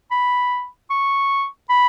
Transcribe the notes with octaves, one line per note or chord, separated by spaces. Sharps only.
B5
C#6
B5